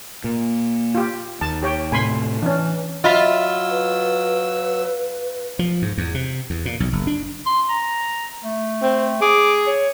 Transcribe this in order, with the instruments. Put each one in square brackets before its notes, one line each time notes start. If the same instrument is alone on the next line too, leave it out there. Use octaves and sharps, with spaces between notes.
[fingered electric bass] A#2
[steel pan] F4 G4
[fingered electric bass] D#2 [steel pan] A5
[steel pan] G4 C#5 G5
[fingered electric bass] A2 C3 [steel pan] G#5 B5 C6
[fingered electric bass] E3 [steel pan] C#4 D4
[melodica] F#3 E6 [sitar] F4 [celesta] D#5 B5 B6 [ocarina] E5
[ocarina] B4
[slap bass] F3
G#2
E2
C3
E2
A#2
B1
F#1
D4
[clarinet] C6
A#5
A3
[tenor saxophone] C4
[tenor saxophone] G#4 [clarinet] D6
[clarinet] C#5